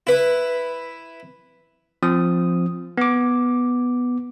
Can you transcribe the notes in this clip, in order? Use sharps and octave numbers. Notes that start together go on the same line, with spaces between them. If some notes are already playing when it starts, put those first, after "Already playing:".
E4 B4
F3 C4 D#6
B3 D6